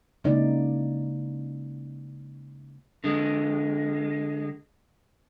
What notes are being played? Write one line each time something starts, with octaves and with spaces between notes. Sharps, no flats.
C#3 G#3 A#3 D#4 E4 D5
D3 G#3